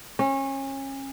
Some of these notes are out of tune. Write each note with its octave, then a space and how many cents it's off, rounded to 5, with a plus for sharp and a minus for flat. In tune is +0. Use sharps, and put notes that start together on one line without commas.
C#4 -30